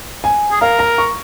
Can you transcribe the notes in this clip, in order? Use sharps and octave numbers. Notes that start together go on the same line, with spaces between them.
G#5
G#4
A#4 F5
A#5
C#6